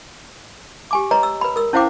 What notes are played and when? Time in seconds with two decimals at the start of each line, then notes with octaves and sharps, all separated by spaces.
0.91 G4 G#5 D6
1.11 B4 C#5 D#5 A#5
1.23 E6
1.41 B4 B5
1.56 A#4 E6
1.73 C#4 E4 C5 F5 G5 D6